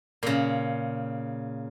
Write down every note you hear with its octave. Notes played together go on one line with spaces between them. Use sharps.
A#2 C#3